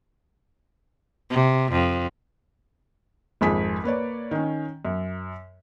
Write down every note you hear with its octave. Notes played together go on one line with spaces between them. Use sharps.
C3
F2
G#1 F2 G#4 B6
A#3 B4 C#5 D5
D#3 C#4
F#2